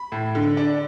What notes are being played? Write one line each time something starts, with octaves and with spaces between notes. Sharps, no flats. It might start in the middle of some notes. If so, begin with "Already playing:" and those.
Already playing: B5
A2
D3
D4